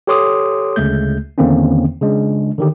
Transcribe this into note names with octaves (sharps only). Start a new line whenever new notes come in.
G4 A4 C#5 C6 D6 D#6
D2 C#3 G#3 A3 G6
E2 D3 D#3 A#3 C4 C#4
C#3 G#3 D4
D3 D#3 G4